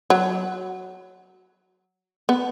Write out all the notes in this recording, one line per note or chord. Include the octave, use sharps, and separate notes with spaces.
F#3
B3